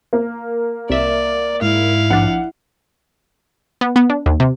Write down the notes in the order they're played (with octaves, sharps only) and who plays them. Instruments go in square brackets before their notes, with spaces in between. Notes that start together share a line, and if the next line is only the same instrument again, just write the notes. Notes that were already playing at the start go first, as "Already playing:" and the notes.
[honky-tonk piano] A#3
[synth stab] C2 E5 [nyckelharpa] D5
[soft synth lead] G#2 [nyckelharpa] E4 F5
[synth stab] A#1 F3 D4 [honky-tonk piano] F#5
[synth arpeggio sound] B3
B3
D4
D#2
C3